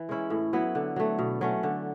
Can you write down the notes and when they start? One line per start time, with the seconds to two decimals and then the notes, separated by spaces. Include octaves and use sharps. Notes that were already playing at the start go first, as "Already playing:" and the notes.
Already playing: E3
0.09 G#3 C#4 E4
0.30 A2
0.53 F#3 B3 E4
0.75 D3
0.96 F#3 A3
1.19 B2
1.41 F#3 A3 C#4
1.63 D3